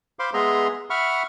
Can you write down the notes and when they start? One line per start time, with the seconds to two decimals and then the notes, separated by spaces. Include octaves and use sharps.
0.19 C5 F5 B5 C6 D6
0.34 G#3 B3 G#4 E5 A#5 C6
0.90 E5 F#5 B5 C#6 F6